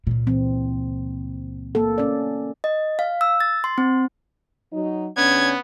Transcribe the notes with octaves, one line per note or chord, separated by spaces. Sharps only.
C#2 A#2
E3 C4
A#3 A4
C#4 D5
D#5
F5
E6
A6
C6
C4
F#3 D#4
C#3 B3 C#4 D4 G#6